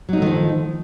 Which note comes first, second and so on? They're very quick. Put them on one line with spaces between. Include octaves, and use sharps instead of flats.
F#3 D#4 A3 D#3 F3